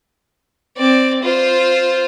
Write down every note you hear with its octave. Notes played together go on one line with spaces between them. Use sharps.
C4 D5
F4 C5